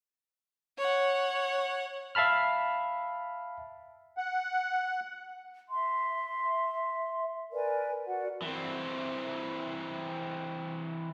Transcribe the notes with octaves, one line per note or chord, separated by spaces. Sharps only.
C#5 F#5
E5 F5 A5 B5 F6
F#5
E5 C6
A#4 B4 D5 G#5
F#4 A#4 D5 F#5
E3 C4